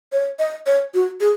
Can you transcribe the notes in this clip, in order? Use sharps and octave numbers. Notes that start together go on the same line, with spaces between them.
C#5
D#5
C#5
F#4
G#4